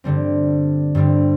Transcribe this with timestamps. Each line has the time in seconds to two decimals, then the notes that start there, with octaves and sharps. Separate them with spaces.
0.04 G2 D3 G3 C4
0.95 G2 D3 G3 C4